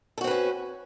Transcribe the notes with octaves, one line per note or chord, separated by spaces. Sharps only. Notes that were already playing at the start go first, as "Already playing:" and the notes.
C4 C#4 F#4 A4 B4